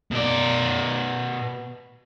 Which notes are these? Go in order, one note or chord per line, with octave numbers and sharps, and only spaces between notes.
B2 D5